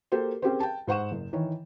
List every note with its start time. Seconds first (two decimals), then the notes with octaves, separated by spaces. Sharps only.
0.12 A#3 F#4 G4 A4 C5
0.42 C4 C#4 G4 G#4 A#4 C5
0.60 G5 A5
0.87 G#2 C5 F#5 C#6 E7
1.11 F#1
1.33 D#3 E3 C#5